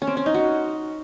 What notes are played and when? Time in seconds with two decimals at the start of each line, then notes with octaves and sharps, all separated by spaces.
0.02 C#4
0.07 C4
0.17 C#4
0.26 D#4
0.34 F#4